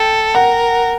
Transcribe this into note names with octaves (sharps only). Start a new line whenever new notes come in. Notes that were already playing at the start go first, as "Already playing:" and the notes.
Already playing: A4 G5
A#4 F#5